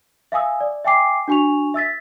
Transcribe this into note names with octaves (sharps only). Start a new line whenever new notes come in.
E5 F5 G#5 D#6 E6
D5
E5 G5 G#5 D6 C7
D4 F#4 G#5 C#6 F7
E5 E6 A6 B6